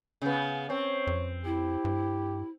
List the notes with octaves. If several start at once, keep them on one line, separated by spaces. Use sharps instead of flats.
C#3 B3
C4 C#5
F2
E4 G4
G2